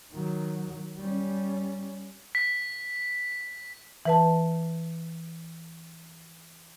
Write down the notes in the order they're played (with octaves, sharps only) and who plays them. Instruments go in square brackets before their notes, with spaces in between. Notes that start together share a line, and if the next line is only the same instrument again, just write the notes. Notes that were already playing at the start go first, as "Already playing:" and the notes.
[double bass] D#3 F#3
G3 C#4
[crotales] B6
[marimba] E3 B4 A5